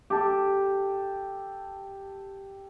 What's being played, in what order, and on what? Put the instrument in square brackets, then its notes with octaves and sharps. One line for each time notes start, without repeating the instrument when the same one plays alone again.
[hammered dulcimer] G4 A4